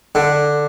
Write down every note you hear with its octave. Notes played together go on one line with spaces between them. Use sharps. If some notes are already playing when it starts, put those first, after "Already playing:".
D3